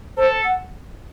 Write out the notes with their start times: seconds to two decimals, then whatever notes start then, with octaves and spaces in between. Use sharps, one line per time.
0.17 A4 C5
0.44 F#5